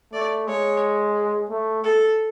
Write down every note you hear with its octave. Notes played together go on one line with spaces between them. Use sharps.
A3 D5
G#3 C#5
A3
A4